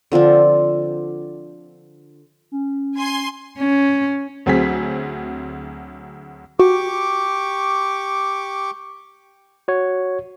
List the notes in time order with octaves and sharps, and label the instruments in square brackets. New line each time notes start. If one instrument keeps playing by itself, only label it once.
[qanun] D3 F3 C4 D4
[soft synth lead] C#4
[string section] G#5 C6
[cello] C#4
[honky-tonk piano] D2 F#3 C4 G#4 B6
[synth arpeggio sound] F#4 [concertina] G4 C#6 D6
[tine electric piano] F#4 C#5